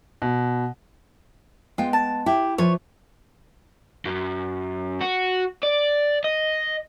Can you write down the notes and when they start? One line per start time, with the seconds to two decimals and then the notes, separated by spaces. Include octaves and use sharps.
0.22 B2
1.78 G#3 B3 F4 G5
1.93 A5
2.26 E4 G4
2.58 F3 F4 B4 C#5
4.05 F#2
5.01 F#4
5.63 D5
6.24 D#5